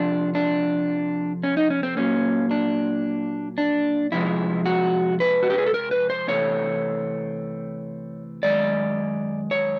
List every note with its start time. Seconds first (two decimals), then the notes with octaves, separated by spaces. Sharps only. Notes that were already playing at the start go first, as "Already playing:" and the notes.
Already playing: F2 C3 F3 D4
0.35 D4
1.43 C#4
1.57 D#4
1.70 C#4
1.83 C4
1.97 A#2 F#3 A#3 C#4
2.51 D4
3.58 D4
4.12 F2 C3 F3 G#3 E4
4.66 F#4
5.20 B4
5.43 F#4
5.50 G4
5.58 G#4
5.66 A4
5.74 A#4
5.91 B4
6.10 C5
6.28 C3 E3 A3 C4 C#5
8.43 F#2 D#3 G#3 D5
9.51 C#5